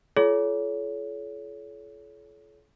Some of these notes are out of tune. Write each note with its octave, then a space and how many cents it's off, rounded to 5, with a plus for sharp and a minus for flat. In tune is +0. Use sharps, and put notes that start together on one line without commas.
F4 -30 A4 -40 C#5 +25